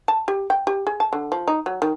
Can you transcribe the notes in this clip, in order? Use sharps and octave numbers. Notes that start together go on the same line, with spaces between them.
A5
G4
G5
G4
G#4
A5
D3
F3
D#4
F#3
D#3